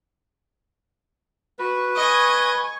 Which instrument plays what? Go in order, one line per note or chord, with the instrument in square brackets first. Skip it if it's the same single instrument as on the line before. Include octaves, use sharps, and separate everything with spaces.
[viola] F#4 [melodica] B4
[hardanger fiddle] D#5 [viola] G#5 C#6